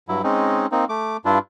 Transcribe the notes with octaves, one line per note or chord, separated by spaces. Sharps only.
G2 F#3 E4
G#3 C4 C#4 D#4
A#3 C4 D#4
A3 D6
G2 D4 E4 F4